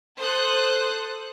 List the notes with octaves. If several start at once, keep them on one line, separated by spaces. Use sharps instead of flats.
A4 C5 D#6 F#6